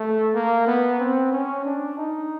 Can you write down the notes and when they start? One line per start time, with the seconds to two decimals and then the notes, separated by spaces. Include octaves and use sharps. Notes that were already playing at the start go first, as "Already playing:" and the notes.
Already playing: A3
0.34 A#3
0.67 B3
1.00 C4
1.32 C#4
1.65 D4
1.97 D#4